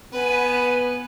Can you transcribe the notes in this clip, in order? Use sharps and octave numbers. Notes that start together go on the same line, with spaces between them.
B3 B4 G#5